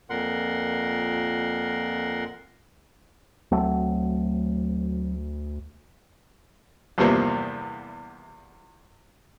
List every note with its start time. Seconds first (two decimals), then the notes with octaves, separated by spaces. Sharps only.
0.10 F2 A#2 A#4 F#5 C6
3.52 D2 F#3 A3 C4
6.98 E2 G2 C3 F3 A#3 B3